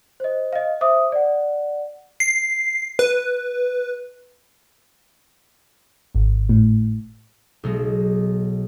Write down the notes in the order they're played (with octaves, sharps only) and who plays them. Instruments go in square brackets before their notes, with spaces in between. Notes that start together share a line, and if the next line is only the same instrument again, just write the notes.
[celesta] C5 D#5
D#5 F5
C5 E5 D6 D#6
D5 F#5
[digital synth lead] C7
B4
[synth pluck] G#1
A2
[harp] B1 F#3 G#3